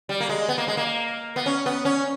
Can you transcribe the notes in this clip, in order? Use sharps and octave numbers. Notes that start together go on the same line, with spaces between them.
G3
A#3
G#3
B3
A#3
G#3
A#3
B3
C#4
B3
C#4